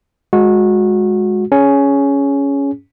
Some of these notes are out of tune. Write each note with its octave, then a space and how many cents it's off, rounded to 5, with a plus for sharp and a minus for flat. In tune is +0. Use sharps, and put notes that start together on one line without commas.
G#3 +0 F#4 -25
C#4 +10 G#4 +5